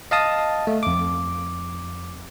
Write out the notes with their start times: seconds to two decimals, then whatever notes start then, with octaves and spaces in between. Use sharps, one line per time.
0.11 D#5 F5 A5 D#6
0.67 A3
0.83 F2 D6